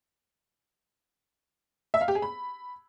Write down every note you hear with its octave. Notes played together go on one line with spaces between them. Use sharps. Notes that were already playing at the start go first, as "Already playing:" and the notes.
E5
F5
G4
G#4
B5